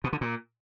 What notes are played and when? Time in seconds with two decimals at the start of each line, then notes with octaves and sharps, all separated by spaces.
0.04 B2
0.13 D3
0.21 A#2